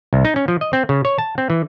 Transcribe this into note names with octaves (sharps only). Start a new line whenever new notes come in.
C2
D#4
C#4
F3
D#5
C4
C#3
C#5
A5
C4
E3